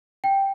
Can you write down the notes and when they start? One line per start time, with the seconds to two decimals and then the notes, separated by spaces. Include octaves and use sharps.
0.24 G5